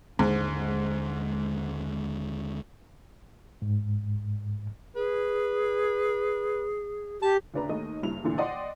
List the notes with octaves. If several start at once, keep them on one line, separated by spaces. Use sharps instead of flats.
D#2 G#2 D3 G#3
G#2
G#4 B4
G4 A5
D2 C#3 D4 B4 A#5
D#2 D#3 A3 D#5
F#1 G2 E4 F7
D2 A#2 D3 E3
D5 D#5 F#5 G5 C6